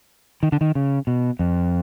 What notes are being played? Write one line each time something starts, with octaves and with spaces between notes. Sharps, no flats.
D#3
D3
D#3
C#3
B2
F2